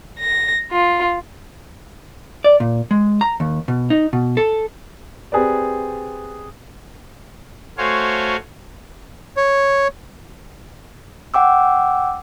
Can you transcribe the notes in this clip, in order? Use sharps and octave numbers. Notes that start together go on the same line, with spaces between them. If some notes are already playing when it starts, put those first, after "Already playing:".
A#6
F4
D5
A#2
G#3
A#5
D#2
B2
D#4
B2
A4
C4 G4 G#4 B4 D5
A3 F#4 C5 C#5 F5 G#5
C#5
F#5 G5 D6 E6